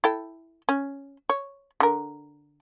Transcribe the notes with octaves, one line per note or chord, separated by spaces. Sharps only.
E4 A4 G5
C#4
C#5
D3 A#4